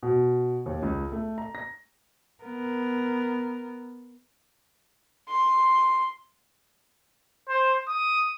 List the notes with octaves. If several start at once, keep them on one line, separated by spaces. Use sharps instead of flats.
B2
D#2
C#2
A3
A#5
A#6
B3 A#4
C6
C5
D#6